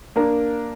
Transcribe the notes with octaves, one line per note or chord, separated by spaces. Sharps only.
A#3 D4 A#4